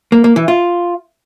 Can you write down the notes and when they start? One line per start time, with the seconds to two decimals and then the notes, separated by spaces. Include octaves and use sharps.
0.12 A#3
0.24 A#3
0.36 E3
0.48 F4